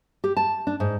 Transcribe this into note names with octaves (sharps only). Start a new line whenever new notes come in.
G4
A5
D4
G#2